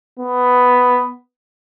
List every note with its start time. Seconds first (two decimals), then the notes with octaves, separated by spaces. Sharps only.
0.19 B3